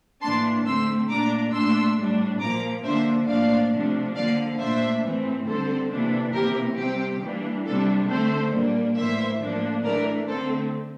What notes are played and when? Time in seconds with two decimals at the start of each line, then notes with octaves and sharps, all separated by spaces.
0.22 A2 E3 A#3 D4 A5 C6
0.66 D3 A3 C4 C6 E6
1.09 A#2 A3 D4 A#5 D6
1.53 A#2 A3 D4 C6 E6
1.98 A2 G3 D4
2.41 A#2 F3 A#3 A#5 D6
2.84 D3 F3 A#3 D4 C5 E5
3.28 A2 F3 A#3 D4 D5 F5
3.72 C3 F3 A3 D4
4.16 D3 F3 A#3 D5 F5
4.59 A#2 A3 D4 C5 E5
5.03 A2 E3 A3 C4
5.46 D3 G3 C4 A4 C5
5.90 C3 E3 A#3 D4
6.34 C3 E3 A#3 G4 A#4
6.78 C3 G3 C4 G4
7.21 E3 G3 A#3 D4
7.65 C3 G3 D4 A4
8.08 D3 A3 C4 A4 C5
8.53 A#2 G3 A#3 D4
8.96 A2 E3 A#3 C5 E5
9.40 A2 F3 A#3 D4
9.84 E3 A3 D4 A#4 D5
10.27 D3 A3 C4 A4 C5